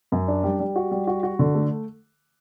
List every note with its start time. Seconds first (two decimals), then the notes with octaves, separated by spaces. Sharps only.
0.12 F#2
0.28 D4
0.43 G3
0.59 G3
0.76 F#4
0.91 G3
1.07 F#4
1.23 F#4
1.39 D3
1.55 A3